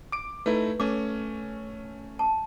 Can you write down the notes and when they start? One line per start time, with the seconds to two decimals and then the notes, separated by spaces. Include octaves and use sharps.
0.12 D6 D7
0.46 A3 D#4 E4 B4
0.80 A3 C#4 D6
2.19 A5